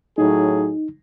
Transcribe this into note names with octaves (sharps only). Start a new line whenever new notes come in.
A2 F#3 D#4 G#4